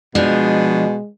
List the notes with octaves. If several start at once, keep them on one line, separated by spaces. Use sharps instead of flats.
B2 F3 G#3 D4